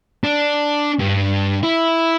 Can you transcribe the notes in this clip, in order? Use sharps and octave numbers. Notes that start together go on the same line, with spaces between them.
D4
G2
E4